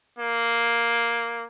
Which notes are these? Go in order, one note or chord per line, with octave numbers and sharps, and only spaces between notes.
A#3